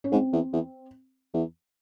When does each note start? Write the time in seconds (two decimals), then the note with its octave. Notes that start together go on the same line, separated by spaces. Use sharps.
0.04 C#4
0.12 G#2 C4
0.33 E2
0.53 E2
1.34 E2